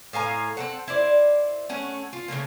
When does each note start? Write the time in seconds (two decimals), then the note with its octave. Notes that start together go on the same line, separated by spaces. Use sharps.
0.13 A2 F5 G#5 A#5
0.57 C4 A4 F#5
0.88 E4 C5 D5
1.69 A3 C#4 F#5
2.13 F4
2.28 C#3 F#3 A3 A#3